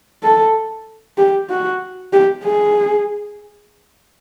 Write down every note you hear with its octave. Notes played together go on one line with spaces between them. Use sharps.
A4
G4
F#4
G4
G#4